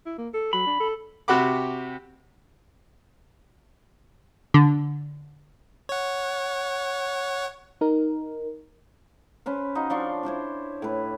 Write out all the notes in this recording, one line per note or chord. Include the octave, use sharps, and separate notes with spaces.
E4
A#3
A4
F#3 B5
D4
A4
C3 F#4 G4 F#5 B5 D6
D3
C#5 F#5
D#4 A#4
C#4 B4 C5
D#4 F#4 D#5 F5
F3 D4 C6 C#6
D4 E4 C5 C#5
A2 B4